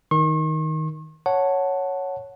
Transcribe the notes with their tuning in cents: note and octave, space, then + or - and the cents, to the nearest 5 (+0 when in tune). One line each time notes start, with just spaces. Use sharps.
D#3 +10 C#6 -45
C#5 +0 F#5 -5 A5 +5